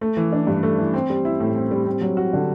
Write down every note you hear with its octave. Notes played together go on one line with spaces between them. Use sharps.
A3
E3
D4
G2
A3
E3
C4
G3
E4
A2
C4
G3
C4
F#3
F#4
D3